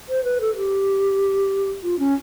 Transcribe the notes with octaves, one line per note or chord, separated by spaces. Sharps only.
C5
B4
A4
G4
F4
C#4